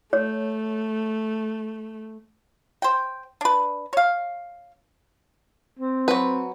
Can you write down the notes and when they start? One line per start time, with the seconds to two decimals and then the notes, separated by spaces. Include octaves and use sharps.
0.13 A3 C#5
2.82 C5 G5
3.41 D4 B4
3.93 C#5 F5
5.79 C4
6.08 F#3 B4